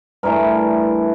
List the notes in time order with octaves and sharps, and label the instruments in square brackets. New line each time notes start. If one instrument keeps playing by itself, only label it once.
[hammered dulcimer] G2 E3 A3 A#4